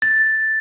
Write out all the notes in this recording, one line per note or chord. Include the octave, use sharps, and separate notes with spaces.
A6